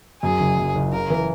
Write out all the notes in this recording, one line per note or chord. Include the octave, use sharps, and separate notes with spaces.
F#2 G#4
F#1
F#2
F#1
C#3 A#4
E3